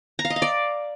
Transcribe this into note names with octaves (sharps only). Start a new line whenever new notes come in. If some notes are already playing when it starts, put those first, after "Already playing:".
A#5
F5
D#5
F5
D5